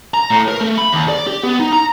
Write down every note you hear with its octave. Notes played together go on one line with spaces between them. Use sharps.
A#5
A2
A#4
A3
B5
D#2
D5
G4
B3
D#4
A#5